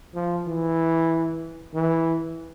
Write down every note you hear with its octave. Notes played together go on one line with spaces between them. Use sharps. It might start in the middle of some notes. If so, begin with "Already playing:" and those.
F3
E3
E3